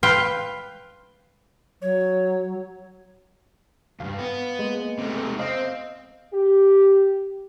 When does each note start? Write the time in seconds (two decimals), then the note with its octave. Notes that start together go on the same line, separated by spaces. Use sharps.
0.03 B4 F5 G5 C6
1.82 F#3 C#5
4.00 D2 G2 F5
4.19 B3
4.59 G#3 A#3
4.99 C3 A3
5.39 C4 C5 D#5 F5
6.34 G4